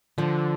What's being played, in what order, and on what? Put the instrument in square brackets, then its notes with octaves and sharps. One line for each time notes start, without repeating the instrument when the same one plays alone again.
[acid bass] D3 [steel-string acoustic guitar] F3